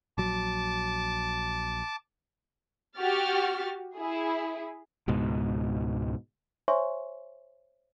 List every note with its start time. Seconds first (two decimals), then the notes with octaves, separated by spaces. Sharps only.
0.18 A#1 F#3 A5 D6
2.97 F#4 G4 F6 A6
3.97 E4 G#4
5.08 C#2 G#2 B2
6.68 C5 C#5 E5 G#5 C6 C#6